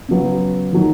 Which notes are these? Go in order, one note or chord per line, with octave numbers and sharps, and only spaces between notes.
C#3 F#3 B3
D#3 F#3